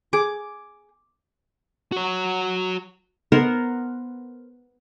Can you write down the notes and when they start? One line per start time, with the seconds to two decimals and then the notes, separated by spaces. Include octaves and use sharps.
0.13 G#4 D6
1.92 F#4 C#5
3.32 B3 A#4 C5 F#5